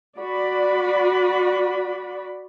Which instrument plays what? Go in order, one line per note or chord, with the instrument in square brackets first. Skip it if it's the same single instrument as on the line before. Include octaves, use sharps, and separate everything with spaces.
[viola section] F#4 D5 B5